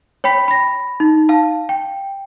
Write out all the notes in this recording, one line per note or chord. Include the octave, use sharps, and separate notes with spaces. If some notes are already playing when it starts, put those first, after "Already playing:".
C#5 G5 B5 B6
B5 A#6
D#4
F5 A5
G5